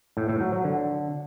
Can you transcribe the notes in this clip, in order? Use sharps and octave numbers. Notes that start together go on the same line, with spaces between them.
A2
A2
F#3
F#3
D3